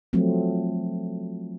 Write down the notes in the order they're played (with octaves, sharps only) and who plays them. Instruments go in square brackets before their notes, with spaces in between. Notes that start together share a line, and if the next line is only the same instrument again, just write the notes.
[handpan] F3 F#3 A3 C4